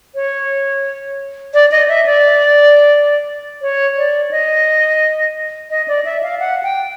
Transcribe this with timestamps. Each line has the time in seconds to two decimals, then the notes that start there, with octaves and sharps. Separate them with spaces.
0.15 C#5
1.54 D5
1.71 D#5
1.89 E5
2.06 D5
3.62 C#5
3.97 D5
4.31 D#5
5.70 D#5
5.88 D5
6.05 E5
6.23 F5
6.40 F#5
6.63 G5